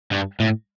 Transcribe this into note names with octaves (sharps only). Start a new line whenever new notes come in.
G2
A2